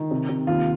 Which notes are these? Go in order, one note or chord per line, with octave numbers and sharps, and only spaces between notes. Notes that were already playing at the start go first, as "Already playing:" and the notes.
Already playing: D#3
C3
C3
D#2 F4